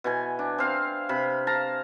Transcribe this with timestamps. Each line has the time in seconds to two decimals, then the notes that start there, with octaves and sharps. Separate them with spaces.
0.04 B2 E3 G#5
0.39 D4
0.59 C4 F5
1.09 C3 B5
1.47 F5 A5 A#5